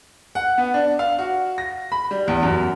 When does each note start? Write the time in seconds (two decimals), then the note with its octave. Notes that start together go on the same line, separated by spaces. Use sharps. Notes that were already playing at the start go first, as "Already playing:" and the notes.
0.35 F#5
0.58 B3
0.74 D4
0.99 F5
1.19 F#4
1.58 A#6
1.92 B5
2.11 G3
2.28 E2
2.43 F#2